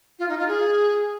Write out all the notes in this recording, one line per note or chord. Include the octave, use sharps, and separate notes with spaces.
F4
D#4
F4
G#4